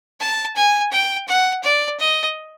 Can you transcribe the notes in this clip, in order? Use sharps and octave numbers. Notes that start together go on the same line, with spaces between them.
A5
G#5
G5
F#5
D5
D#5